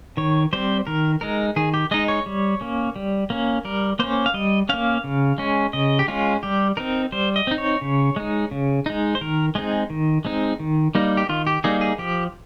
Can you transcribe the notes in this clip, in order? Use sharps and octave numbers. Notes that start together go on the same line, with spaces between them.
D#3 C#5
G3 C4 C5
D#3 A#4
G#3 D#4 A#4
D#3 G#4
G4
G#3 D#4 D#5
C#5
G3
A#3 C#4
G3
A#3 C#4
G3 A#4
A#3 C#4 C5
F5
G3 D#5
A#3 C#4 F5
C#3
G#3 C#4
C#3 D#5
G4
G#3 C#4 F4
G3 G4
C4 D#4 A#4
G3 C5
D#5
C4 D#4
C#5
C#3
G#3 D#4
C#3
G#3 D#4
C5
D#3 A#4
G#3 C4 D#4 G#4
D#3
G#3 C4 D#4
D#3
G3 A#3 D#4
G4
D#3 F4
G4
G3 A#3 D#4 G#4
G#4
F3 G4